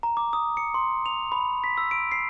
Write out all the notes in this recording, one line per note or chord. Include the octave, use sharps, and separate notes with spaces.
A#5
D6
D#6
C#7
C6
F7
B5
B6
E6
D7
C7